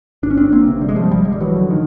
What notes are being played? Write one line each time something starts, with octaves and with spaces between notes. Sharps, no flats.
G1 D4
C#4
C4 D4
A#3 C4
C3
G3
G#3
F3 G3
G1 F3 G3
G#3
G3
E3 F#3
D3
D#3